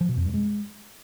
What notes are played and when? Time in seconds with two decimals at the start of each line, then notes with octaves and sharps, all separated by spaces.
0.01 F3
0.09 B2
0.17 F2
0.25 G2
0.34 G#3